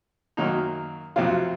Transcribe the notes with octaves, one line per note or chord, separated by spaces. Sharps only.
F#2 D#3 F#3 A#3 D#4
F2 C3 F#3 F4